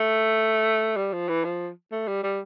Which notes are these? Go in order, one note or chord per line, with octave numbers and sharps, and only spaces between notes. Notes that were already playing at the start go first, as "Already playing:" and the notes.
Already playing: A3
G3
F3
E3
F3
A3
G3
G3